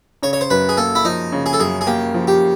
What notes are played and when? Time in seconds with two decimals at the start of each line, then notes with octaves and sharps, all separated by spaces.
0.23 C#3 C#5
0.33 C#5
0.41 C5
0.50 F#2 B4
0.69 G#4
0.77 A#3 A4
0.95 E4
1.05 F3 D#4
1.32 C#3
1.46 G#4
1.53 A4
1.60 F#2 G#4
1.81 G#4
1.87 A#3 G4
2.14 F3
2.28 G4